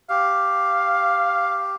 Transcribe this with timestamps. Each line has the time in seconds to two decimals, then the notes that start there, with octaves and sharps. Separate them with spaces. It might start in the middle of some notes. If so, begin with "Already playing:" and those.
0.10 G4 F5